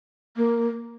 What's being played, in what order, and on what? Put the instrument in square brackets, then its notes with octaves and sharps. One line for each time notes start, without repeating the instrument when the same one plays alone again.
[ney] A#3